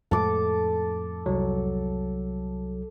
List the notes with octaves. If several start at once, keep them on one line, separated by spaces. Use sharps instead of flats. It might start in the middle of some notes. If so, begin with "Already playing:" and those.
F2 A2 G#3 A4 D6
C2 F#3